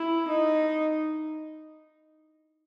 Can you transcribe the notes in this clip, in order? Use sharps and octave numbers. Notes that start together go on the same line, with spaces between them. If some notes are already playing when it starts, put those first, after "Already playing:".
Already playing: E4
D#4